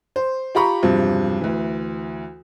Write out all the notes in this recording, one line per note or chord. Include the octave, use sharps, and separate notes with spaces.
C5
F4 G4 A#5 B5 C#6
E1 G2 C3 F3
D2 E3